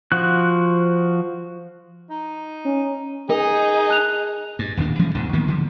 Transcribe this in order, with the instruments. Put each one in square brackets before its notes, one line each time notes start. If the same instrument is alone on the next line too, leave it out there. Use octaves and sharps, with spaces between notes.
[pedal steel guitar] F3 F#4 F#6
[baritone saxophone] D#4
[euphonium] C#4
[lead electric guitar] D#4 [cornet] G#4 [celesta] A#4
[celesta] A5 F#6 F7
[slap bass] G2
D#1 D#2 A2 D4
E3 F3 G#3 C#4
D2 G#2 B2 D3
D#3 F3 A#3 B3
D3 F3